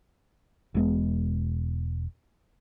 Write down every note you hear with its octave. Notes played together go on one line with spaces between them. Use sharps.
E1 G#3 B3